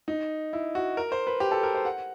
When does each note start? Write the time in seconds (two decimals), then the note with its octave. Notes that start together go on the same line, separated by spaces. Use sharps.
0.08 D#4
0.53 E4
0.75 F#4
0.97 A#4
1.12 C5
1.27 B4
1.40 G4
1.51 A4
1.63 A#4
1.75 C5
1.85 F#5